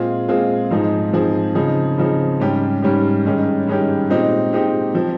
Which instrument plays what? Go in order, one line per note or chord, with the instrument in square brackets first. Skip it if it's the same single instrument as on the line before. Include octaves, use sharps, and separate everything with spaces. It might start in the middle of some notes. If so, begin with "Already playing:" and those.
Already playing: [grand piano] A#2 G#3 C4 F4 G#4
A#2 G#3 C4 F4 G#4
G#2 F3 C4 D#4 G#4
G#2 F3 C4 D#4 G#4
C#3 F3 C4 D#4 G#4
C#3 F3 C4 D#4 G#4
G#2 G3 C#4 G4
G#2 G3 C#4 G4
G2 D#3 G#3 C#4 G4
G2 D#3 G#3 C#4 G4
A#2 G#3 C4 D#4 G4
A#2 G#3 C4 D#4 G4
F3 C4